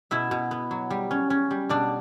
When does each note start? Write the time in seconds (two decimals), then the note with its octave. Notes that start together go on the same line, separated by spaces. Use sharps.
0.11 B2 E4 E5
0.31 B2
0.51 B3
0.71 F#3
0.90 G3
1.11 C#4
1.30 C#4
1.51 G3
1.69 B2 D4 D5